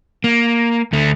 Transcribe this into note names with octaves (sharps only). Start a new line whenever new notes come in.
A#3
D2 A3